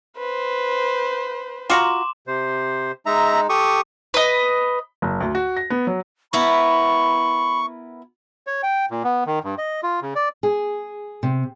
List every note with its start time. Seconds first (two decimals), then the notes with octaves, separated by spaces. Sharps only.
0.17 B4 C5
1.70 F4 F#4 A#5 C6 D6 E7
2.27 C3 C5
3.06 G#3 D#4 E5 A#5
3.49 G4 A4 C#6 D#6
4.14 B4 D#5
5.02 F#1
5.21 D2
5.35 F#4
5.57 A#6
5.70 B3
5.87 F#3
6.33 B3 E4 A#4 B5 C#6
8.47 C#5
8.63 G5
8.91 A#2
9.04 B3
9.26 D#3
9.44 G2
9.58 D#5
9.83 F4
10.02 C#3
10.16 D5
10.43 G#4
11.23 C3